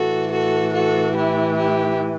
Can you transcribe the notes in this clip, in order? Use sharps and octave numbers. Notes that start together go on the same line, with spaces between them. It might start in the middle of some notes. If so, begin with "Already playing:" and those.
Already playing: A2 E3 F#4 A4
F#4 A4
F#4 A4
E4 G4
E4 G4